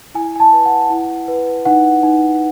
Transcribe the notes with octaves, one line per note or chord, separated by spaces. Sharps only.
E4 G#5
G#5
A5
B4
F#5
E4
B4
D#4 F#5
D#4